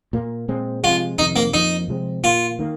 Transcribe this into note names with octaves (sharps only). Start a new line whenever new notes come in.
A#2 A#3
A#2 G#3 C4
C3 F3 G#3 F4
F2 C3 D#3 D#4
A#3
F2 F3 A#3 D#4
C3 F3 G#3 C4
A#2 A#3 F4
D#3 A#3